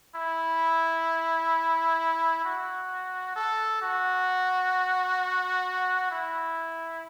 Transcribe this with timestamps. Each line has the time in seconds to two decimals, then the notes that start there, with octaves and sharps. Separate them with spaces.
0.15 E4
2.45 F#4
3.36 A4
3.82 F#4
6.11 E4